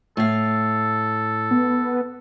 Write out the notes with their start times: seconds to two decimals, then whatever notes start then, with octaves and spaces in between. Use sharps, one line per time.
0.17 A2 A4 F5
1.51 B3